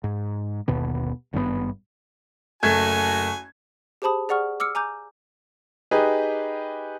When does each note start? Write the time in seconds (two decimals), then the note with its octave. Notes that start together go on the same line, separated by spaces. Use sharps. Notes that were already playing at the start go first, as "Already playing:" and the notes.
0.04 G#2
0.68 G1 D#2 B2 B3
1.33 G#1 G2 D3 B3
2.63 F#1 A3 F#4 G#5 G#6
4.02 G4 G#4 C5 A5 B5 D#6
4.29 G#4 D5 F#5 C#6 F6
4.60 D6 E6 F6 C#7
4.75 G#5 A#5 D6 G6
5.91 D#4 G4 G#4 B4